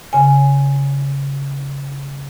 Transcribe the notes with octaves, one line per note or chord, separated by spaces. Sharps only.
C#3 G#5